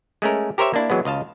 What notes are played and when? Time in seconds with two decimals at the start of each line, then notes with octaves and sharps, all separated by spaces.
0.22 G#3 A3 C#4 A#4
0.58 G4 A#4 C5 C#5 E5
0.74 A#3 D4 E4
0.90 E3 F#3 G#3 B3
1.05 C#2 D#5 F5 A5